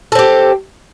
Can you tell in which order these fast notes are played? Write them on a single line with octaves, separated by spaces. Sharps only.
A4 C4 G4